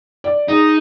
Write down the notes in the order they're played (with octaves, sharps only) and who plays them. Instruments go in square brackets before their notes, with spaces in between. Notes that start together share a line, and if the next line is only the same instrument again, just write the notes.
[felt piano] D5
[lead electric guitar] D#4 [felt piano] G#4